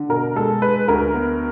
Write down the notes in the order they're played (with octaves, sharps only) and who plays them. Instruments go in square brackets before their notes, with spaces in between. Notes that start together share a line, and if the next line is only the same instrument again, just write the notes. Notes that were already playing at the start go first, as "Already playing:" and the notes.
Already playing: [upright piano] D3
[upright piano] B2 [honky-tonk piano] A#4
[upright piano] G#3 [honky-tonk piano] A4
[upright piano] G#3 [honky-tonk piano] B4
[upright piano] D2 [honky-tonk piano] A#4
[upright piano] B3